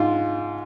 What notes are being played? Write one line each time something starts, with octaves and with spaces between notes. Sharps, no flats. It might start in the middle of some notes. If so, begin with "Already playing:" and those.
Already playing: G#2 F4